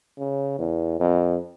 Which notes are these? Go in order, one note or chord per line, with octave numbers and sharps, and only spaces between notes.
C#3
E2
F2